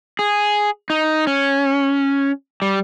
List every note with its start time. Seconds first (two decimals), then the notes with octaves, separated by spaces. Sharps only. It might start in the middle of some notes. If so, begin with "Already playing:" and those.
0.19 G#4
0.90 D#4
1.27 C#4
2.62 G3